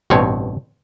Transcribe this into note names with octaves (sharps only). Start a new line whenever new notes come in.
A1 G2 B2 C4 C#5